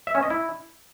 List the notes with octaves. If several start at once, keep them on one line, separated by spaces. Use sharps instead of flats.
E5
C#4
D#5
E4